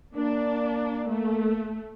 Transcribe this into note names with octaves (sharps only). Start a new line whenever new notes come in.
A#3 D4
A3